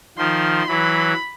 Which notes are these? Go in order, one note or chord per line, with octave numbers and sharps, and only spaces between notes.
D#3 F3 C6
E3 F#3 B5